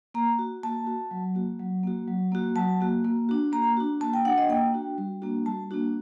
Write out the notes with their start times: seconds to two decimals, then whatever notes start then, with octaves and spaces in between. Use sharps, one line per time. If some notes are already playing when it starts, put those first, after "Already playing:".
0.14 A#3 A#5
0.39 F#4
0.63 A#3 A5
0.87 F#4
1.11 F#3
1.35 A#3 F#4
1.59 F#3
1.83 A#3 F#4
2.08 F#3
2.32 A#3 F#4
2.56 F#3 A5
2.81 A#3 F#4
3.04 A#3
3.29 D4 F#4
3.52 A#3 A#5
3.77 D4 F#4
4.01 A#3 A5
4.13 G5
4.25 D4 F#5
4.28 F#4
4.38 D#5
4.49 A#3 G5
4.74 D4 F#4
4.98 G3
5.22 A#3 D4 F#4
5.46 G3 A5
5.71 A#3 D4 F#4